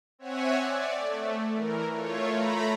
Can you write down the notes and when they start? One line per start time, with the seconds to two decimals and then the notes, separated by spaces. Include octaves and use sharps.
0.19 C4 C#5 E5 F#5 G#5
0.57 D5
0.95 A3
1.53 E3 A#4
1.93 A3 F4 C#5
2.28 A3 A#5 B5